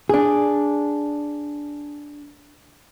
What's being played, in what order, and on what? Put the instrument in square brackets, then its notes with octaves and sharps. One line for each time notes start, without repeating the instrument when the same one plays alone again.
[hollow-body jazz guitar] D4 G#4